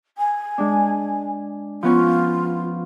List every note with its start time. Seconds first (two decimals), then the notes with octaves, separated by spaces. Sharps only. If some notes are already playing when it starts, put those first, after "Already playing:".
0.18 G#5
0.58 G#3 D4
1.83 F3 B3 C#4 F4